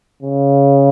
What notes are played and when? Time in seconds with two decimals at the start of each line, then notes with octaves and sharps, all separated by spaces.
0.22 C#3